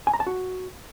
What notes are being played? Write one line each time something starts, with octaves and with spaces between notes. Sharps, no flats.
G#5
A#5
A5
F#4